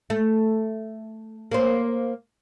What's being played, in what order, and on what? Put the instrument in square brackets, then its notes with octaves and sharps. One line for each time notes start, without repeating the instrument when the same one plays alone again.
[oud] A3
A#3 C5